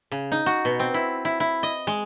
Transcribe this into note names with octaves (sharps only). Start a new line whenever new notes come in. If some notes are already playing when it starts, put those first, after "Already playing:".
C#3
D#4
F#4
B2
C4
E4
E4
E4
D#5
G#3